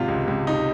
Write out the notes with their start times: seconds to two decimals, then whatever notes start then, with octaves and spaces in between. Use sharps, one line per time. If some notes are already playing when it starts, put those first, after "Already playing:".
Already playing: G#1 C3 F4
0.08 C#2
0.28 C#2
0.47 C3 D#4